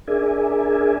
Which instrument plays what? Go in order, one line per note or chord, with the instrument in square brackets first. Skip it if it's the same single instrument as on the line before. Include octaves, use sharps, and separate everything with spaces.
[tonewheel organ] D4 G#4 A#4 D5 E5 G#5